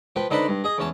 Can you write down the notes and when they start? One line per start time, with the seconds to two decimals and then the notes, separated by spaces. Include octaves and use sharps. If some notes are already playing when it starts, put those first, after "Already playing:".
0.16 F3 B4 G5
0.31 D3 D#4 B4 C5 D5 B5
0.48 G2
0.64 G#4 D#5
0.78 E2 C#4 A5